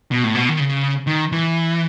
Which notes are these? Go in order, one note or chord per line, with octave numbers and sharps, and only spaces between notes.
B2
A2
B2
D#3
C#3
D#3
E3